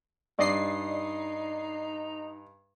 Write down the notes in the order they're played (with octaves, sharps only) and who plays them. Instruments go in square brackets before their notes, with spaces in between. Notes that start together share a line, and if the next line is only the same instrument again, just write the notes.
[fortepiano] G2 [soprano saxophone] D#4 [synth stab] D5 D#5 C7